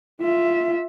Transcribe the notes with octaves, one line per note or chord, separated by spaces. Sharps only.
F4 E5